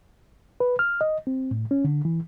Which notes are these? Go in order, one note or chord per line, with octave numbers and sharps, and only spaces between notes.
B4
F6
D#5
C4
A2
C#4
D3
E3